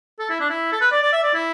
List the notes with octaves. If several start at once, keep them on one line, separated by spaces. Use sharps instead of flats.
A4
E4
D4
E4
A4
B4
D5
D5
E5
D5
E4